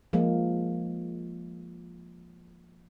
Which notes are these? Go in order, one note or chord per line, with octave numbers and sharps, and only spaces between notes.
F3 G#3 A#3